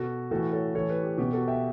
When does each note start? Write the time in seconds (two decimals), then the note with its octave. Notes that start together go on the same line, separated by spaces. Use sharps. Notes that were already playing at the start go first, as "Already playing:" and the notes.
Already playing: B2 F#4 A4
0.31 A2 E3 F#4 A4
0.52 A4 C#5
0.74 A2 E3 A4 C#5
0.89 G4 B4
1.03 G4
1.18 B2 G4
1.33 F#4 A4
1.48 E5 G5